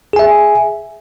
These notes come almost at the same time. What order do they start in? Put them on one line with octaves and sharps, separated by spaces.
G#4 G#5 E5